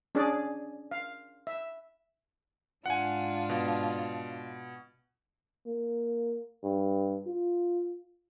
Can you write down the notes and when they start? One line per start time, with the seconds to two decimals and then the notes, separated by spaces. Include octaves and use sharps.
0.15 C#4 D4 G#4 D5
0.91 F5
1.47 E5
2.86 G#2 D4 F4 F#5 G#5
3.49 B2
5.67 A#3
6.63 G2
7.27 F4